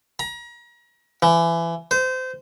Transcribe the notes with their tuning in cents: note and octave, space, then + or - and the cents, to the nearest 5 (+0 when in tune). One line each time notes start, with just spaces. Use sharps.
A#5 +35
E3 +25
C5 -25